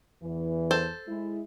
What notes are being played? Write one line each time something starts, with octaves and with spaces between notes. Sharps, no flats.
E2 E3
A4 C5
G#3 E4